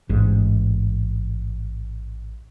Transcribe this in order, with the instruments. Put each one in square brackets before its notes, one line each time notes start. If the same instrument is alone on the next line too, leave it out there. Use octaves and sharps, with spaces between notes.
[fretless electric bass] A1 G#2